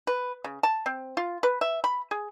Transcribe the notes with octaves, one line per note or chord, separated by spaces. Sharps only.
B4
C#3
A5
C4
F4
B4
E5
B5
G#4